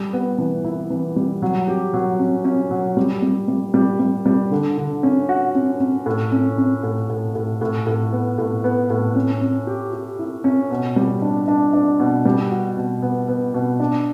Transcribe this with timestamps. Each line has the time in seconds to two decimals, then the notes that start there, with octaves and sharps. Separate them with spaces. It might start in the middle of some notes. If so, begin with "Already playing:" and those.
Already playing: G3
0.13 B3
0.38 E3
0.65 E4
0.90 E3
1.16 G3
1.42 F#3
1.68 G4
1.94 F#3
2.19 C#4
2.45 C#4
2.71 F#3
2.97 G3
3.22 G3
3.48 G3
3.74 G3
4.00 G3
4.26 G3
4.51 D3
4.77 D3
5.03 C#4
5.29 F#4
5.55 C#4
5.80 C#4
6.06 A2
6.32 C#4
6.58 C#4
6.83 A2
7.09 A2
7.35 A2
7.61 A2
7.87 A2
8.12 B3
8.38 A2
8.64 B3
8.90 A2
9.16 C#4
9.41 C#4
9.67 G4
9.93 G4
10.19 E4
10.44 C#4
10.71 B2
10.96 G3
11.22 D4
11.48 D4
11.73 D4
11.99 B2
12.25 G3
12.51 F#4
12.77 B2
13.02 B3
13.28 B3
13.54 B2
13.80 D4